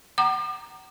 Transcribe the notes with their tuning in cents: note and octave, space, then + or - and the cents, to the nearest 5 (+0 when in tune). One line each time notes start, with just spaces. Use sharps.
F#5 +40 A#5 +0 D6 +40